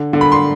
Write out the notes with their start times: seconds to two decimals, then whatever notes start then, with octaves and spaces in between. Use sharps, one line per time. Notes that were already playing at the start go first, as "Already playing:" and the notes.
Already playing: D3
0.13 D3
0.21 B5
0.32 C6